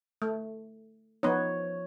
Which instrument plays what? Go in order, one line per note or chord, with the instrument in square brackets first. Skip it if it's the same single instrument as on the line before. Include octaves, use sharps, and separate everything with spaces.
[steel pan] A3
[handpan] F3 C#5 [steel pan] B3 D#4